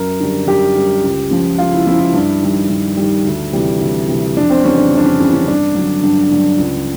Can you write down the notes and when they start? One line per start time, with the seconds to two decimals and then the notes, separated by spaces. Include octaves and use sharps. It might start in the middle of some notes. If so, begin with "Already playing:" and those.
Already playing: F#2 A#4
0.20 D3 G3
0.47 F#2 G4
0.75 D3 G3
1.04 C#2
1.30 C#3 F3
1.58 C#2 F4
1.73 E4
1.87 C#3 F3 E4
2.00 E4
2.14 G2
2.42 D#3 G3
2.70 G2
2.97 D#3 G3
3.25 D2
3.53 C3 E3 G3
3.81 D2
4.08 C3 E3 G3
4.37 F2 D4
4.50 C4
4.64 C#3 E3 G3 C#4
4.78 D4
4.92 F2
4.98 D4
5.06 C#4
5.20 C#3 E3 G3
5.33 C#4
5.47 G2 D4
5.75 D3 F#3
6.03 G2
6.30 D3 F#3
6.58 C#2